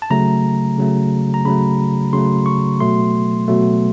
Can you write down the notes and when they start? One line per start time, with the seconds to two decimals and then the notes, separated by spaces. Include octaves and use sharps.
0.02 A5
0.10 C#3 F#3 A3 A#5
0.78 C#3 F#3 A3
1.34 A#5
1.45 C#3 F#3 A3 B5
2.13 C#3 F#3 A3 C6
2.46 C#6
2.80 B2 F#3 A3 C6
3.48 B2 F#3 A3